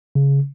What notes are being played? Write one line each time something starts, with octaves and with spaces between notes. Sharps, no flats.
C#3